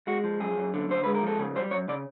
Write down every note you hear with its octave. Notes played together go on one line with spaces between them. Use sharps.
G#3 F#4
F3
F#2 G#4
F#2
D3
D3 C5
G#3 B4
A#4
F3 A4
C#3 G#4
G3 C5
F#2 C#5
C#3 D5